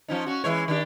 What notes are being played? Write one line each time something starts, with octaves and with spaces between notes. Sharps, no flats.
F3 C#4 D#4
C#4 F#4
E3 G#3 C#5
D#3 D4 G4